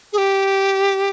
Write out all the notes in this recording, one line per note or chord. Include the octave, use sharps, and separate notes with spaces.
G#4
G4